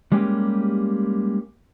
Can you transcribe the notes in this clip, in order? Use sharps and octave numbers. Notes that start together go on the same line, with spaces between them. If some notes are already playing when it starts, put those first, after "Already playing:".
G3 G#3 A#3 C#4 G4